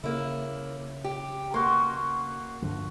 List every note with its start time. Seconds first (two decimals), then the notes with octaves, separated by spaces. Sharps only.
0.03 C#3 A#3 E4
1.04 G4
1.54 A#3 F#4 C6
2.62 G2 D3 F3